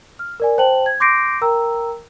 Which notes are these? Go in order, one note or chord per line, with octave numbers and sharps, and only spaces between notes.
F6
A#4 D5 G#5
C5 G5 A5 F#7
G#6
C6 D6 G6 A#6 C7 D7
A#4 G5 A#5 E6